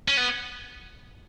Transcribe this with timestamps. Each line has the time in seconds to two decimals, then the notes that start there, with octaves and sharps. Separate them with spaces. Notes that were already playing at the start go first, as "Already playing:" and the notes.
0.08 C#4
0.17 B3